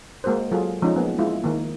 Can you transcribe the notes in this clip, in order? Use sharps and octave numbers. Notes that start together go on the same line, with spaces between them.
G#3 A#3 F#4 A#4 C5
F#3 F4 F#4 G#4 A4
F3 G#3 C#4 D#4
A#3 B3 G#4
G#3 E4 F4
D#3 A#3